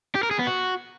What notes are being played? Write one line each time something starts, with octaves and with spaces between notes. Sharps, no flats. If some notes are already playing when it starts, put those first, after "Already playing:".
G4
A#4
G#4
B3
F#4